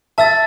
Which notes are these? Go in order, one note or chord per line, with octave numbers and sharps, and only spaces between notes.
E5 A5 E6 A6